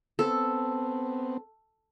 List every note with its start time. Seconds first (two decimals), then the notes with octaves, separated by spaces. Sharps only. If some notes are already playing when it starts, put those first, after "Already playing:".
0.19 B3 C4 A4